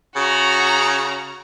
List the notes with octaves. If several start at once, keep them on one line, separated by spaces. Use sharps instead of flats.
C#3 F#4 A#5